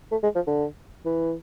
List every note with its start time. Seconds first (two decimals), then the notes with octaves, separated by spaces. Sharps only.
0.12 A3
0.23 G#3
0.35 F3
0.47 D3
1.05 E3